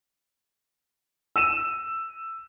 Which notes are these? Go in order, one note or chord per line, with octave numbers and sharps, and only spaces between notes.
E6 D#7 E7